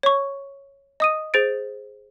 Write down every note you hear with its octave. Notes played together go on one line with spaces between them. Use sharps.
C#5 C#6
D#5 D#6 D#7
G#4 C5 A6 D7